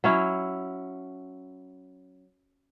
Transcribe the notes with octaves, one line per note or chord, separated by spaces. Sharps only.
F#3 C#4 E4